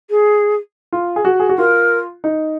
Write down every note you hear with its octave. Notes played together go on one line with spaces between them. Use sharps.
G#4
F4
G#4
F#4
G#4
F#4
F4 A#4
D#4